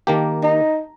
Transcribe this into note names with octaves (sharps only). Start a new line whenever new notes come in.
D#3 A#3 G4 A#5
D#4